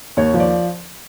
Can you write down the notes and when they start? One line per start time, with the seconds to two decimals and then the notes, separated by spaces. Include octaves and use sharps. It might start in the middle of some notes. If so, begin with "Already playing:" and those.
0.17 D#2 C#5
0.34 F3
0.40 D5